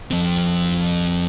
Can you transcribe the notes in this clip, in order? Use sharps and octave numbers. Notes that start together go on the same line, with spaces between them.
F2 C4